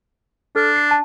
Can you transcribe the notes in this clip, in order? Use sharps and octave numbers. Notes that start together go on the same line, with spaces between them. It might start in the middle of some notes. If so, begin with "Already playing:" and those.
D4 A4 F6
C7
A5